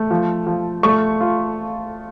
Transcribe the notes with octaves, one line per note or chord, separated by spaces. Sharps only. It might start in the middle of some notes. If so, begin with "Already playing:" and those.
Already playing: A3
F3
F3
A3 C#6
F4